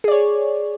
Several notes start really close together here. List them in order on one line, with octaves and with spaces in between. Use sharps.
G#4 D5 C#5